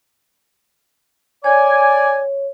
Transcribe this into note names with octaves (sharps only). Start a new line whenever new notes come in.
C#5 D5 G#5